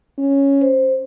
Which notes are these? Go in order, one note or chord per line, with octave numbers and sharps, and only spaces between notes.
C#4
C5